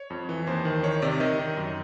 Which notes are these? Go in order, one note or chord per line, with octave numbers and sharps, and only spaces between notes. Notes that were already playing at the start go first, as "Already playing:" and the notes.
Already playing: C#5
F2
E3
D#2 C5
D#3
D#3 C#5
C3 D5
D#3 D#5
D#3
F#2